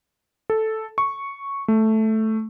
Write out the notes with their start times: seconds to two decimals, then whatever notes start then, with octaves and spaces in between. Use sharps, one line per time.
0.50 A4
0.98 C#6
1.68 A3